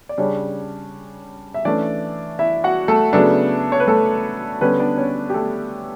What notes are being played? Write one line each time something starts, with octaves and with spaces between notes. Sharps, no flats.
D5
C#3 G3 C#4 D4 C#5
E5
E3 A3 C#4 D4 D5
E4 E5
F#4 F#5
A3 A4
C#3 F#3 A3 B3 D4 A4
C#5
B4
A3 A4
D3 G3 B3 C#4 B4
D4 D5
C#4 C#5
G4
A3 A4